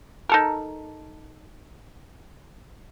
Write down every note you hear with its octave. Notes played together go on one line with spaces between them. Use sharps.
D#4 A4 A#4